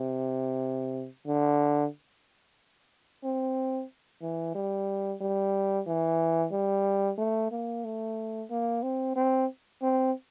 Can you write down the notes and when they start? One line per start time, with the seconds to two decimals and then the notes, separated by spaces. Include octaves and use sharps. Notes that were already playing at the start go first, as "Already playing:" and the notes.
Already playing: C3
1.27 D3
3.24 C4
4.22 E3
4.55 G3
5.21 G3
5.87 E3
6.52 G3
7.18 A3
7.52 A#3
7.85 A3
8.50 A#3
8.83 C4
9.16 C4
9.82 C4